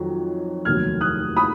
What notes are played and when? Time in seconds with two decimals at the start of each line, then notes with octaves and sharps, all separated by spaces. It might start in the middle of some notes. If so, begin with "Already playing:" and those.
Already playing: F2 D#3 F#3
0.65 F1 D#2 D#3 F#3 F6 G#6
1.01 D#6 F#6
1.36 B5 D#6